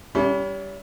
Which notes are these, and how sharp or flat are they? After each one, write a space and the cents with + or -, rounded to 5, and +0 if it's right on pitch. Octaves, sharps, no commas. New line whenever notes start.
G3 +0 C#4 +45 E4 +0